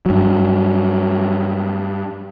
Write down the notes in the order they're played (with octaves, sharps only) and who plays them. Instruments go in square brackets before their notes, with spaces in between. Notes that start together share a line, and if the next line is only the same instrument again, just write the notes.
[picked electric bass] G2 F#3